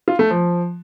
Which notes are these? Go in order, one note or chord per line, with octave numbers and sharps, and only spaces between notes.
F4
A3
F3